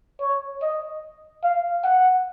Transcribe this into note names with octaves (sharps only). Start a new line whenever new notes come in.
C#5
D#5
F5
F#5